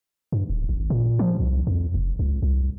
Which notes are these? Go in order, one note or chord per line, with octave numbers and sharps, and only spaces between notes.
G2
D1
G#1
A#2
F3
C2
F2
F1
C#2
C2